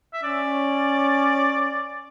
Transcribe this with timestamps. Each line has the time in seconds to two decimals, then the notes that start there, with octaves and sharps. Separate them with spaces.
0.13 E5
0.23 C#4 D5